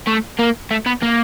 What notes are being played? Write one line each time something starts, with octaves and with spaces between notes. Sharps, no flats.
A3
A#3
A3
B3
A#3